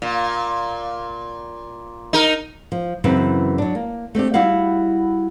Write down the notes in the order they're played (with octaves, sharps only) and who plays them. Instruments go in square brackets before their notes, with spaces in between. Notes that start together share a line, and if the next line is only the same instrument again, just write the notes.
[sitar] A#2
D#4 A#4
[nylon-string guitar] F3
F#2 C#3 E3 C4 E4 B4
F#3 D4
A#3
A3 C4 D4 G4
G3 E4 F#4 F5 F#5